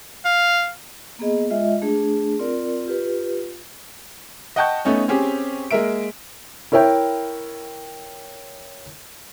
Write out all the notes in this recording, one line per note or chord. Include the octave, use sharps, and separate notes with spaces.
F5
A#3 B3 G#4 D#5
G#3 F4 D#5 E5
A3 D4 G#4
C4 F4 A#4 D5
F4 G4 B4
D#5 F#5 G5 A5 C#6 G6
A3 B3 C#4 D#4
C4 C#4 G4 G#4
G#3 A#3 A#4 E5 D7
E4 A#4 C#5 E5 G5